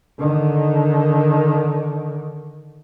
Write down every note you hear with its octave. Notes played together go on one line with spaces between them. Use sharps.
D3 D#3